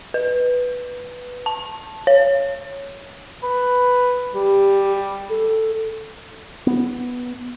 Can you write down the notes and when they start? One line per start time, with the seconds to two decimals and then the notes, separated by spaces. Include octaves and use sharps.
0.14 B4
1.46 A5
2.07 C#5
3.43 B4
4.34 G3 G4
5.30 A4
6.67 B3